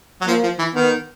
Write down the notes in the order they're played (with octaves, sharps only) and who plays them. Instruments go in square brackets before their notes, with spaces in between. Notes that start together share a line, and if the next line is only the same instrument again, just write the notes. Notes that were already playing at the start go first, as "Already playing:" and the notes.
[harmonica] F#3
[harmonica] F3 [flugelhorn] A#3
[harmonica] F3
E3
[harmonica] D#3 [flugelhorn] B3